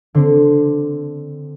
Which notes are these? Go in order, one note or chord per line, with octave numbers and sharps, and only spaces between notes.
D3 C4